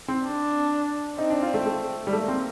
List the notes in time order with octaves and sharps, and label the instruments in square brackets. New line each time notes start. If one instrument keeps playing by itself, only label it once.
[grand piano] C4
[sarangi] D4
[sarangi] C4 [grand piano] D#4
[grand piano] D4
F4
A3
A3
G3
[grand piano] A3 [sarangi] A#3
[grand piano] C4